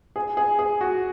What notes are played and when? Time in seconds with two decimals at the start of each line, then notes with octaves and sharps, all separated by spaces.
0.16 G#4
0.37 G#4
0.59 G#4
0.81 F#4